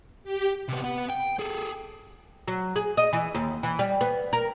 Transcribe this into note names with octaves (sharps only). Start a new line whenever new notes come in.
G4
C3 B3
B3 F#5
G5
G#4 A4
F#3
G#4
D#5
E3
D#2
E3
G3
B3
A#4